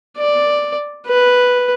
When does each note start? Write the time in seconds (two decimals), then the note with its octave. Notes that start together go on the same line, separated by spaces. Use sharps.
0.18 D5
1.07 B4